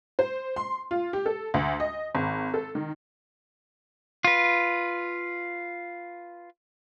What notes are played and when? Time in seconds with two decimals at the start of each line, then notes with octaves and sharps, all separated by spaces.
0.19 C5
0.56 C6
0.91 F4
1.13 G4
1.26 A4
1.54 D2
1.80 D#5
2.15 G#1
2.54 A4
2.75 D#3
4.24 F4 B4